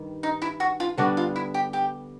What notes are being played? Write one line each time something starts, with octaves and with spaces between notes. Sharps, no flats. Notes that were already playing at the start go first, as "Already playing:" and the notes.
Already playing: G2 D#3 G3
D#4
E4
F#4
F4
D3 G3 B3 D4 F#4
F4
E4
G4
G4